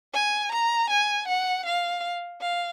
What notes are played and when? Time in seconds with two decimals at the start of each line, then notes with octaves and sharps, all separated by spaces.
0.13 G#5
0.52 A#5
0.90 G#5
1.28 F#5
1.66 F5
2.42 F5